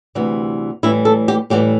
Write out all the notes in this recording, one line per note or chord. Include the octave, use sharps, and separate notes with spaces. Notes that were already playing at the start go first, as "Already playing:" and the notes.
D2 C3 E3 G3
A2 E3 G3 E4
A4
G4
A2 E3 G3 G4